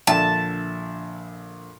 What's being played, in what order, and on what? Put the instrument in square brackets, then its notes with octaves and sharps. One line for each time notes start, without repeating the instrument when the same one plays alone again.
[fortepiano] A#1 D3 E5 [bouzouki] A5